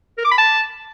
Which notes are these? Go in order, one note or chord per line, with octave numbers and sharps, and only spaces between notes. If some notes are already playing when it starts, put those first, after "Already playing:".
A#4
D6
B5
A5